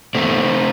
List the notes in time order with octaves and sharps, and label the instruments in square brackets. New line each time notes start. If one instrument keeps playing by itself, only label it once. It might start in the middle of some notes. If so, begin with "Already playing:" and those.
[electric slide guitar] E2 B2 A3 C4